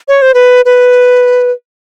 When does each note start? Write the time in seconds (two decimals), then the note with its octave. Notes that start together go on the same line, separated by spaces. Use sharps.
0.08 C#5
0.22 C5
0.34 B4
0.65 B4